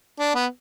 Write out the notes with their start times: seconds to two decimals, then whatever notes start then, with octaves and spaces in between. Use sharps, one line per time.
0.19 D4
0.35 B3